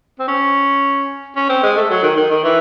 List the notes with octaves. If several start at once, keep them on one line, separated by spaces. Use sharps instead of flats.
C4
C#4
C#4
C4
G#3
A3
F#3
D#3
D#3
D#3
E3